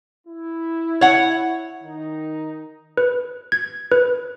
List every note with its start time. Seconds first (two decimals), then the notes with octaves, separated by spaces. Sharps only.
0.27 E4
1.01 C#5 F#5
1.82 D#3 D#4
2.97 B4
3.52 G#6
3.92 B4